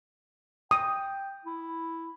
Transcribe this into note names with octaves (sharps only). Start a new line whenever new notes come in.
G5 D#6
E4